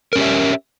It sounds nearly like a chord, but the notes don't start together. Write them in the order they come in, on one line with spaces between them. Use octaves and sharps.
A#4 C#4 G4 E5